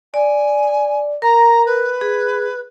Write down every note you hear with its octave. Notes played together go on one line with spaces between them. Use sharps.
D5 G#5
A#4 A#5
B4
G#4